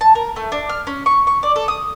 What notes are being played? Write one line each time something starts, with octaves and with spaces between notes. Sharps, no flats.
A5
A#4
A3
D4
F6
C#4
C#6
C#6
D5
A4
D#6